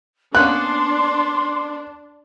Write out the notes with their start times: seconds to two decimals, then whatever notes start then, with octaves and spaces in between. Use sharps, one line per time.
0.35 A#3 B3 C#4 D4 C6 F#6